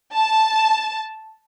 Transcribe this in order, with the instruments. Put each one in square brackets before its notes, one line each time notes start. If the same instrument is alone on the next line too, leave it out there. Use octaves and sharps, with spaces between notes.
[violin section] A5